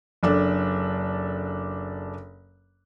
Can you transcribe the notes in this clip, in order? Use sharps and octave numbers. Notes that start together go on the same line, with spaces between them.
F#1 D4 A4